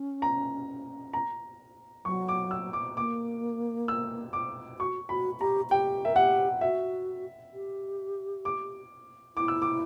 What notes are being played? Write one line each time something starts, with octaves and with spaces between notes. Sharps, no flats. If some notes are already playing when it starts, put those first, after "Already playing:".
Already playing: C#4
A#5
A#5
F#3 C#6
D6
E6
D6
A#3 D6
E6
D6
F#4 C#6
F#4 B5
G4 A#5
G4 G5
A#4 E5
G4 F#5
F#4 E5
G4
D6
E4 D6
E6
D6